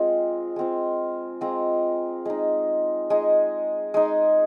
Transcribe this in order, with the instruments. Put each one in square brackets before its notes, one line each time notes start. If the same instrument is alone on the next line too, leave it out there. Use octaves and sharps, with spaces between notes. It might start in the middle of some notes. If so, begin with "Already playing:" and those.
Already playing: [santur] G#3 C4 F4
G#3 C4 F4
G#3 C4 F4 A#5
G#3 D#4
G#3 D#4 G#5
G#3 D#4 G#5